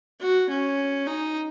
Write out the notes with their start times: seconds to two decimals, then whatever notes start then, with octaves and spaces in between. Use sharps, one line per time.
0.21 F#4
0.50 C#4
1.07 D#4